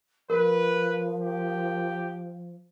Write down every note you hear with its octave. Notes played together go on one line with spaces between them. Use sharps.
F3 A#4 B4
G4